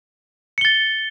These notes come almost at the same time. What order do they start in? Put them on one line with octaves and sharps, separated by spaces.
C#7 G7 A6